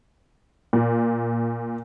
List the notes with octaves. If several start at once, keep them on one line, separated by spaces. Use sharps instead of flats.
A#2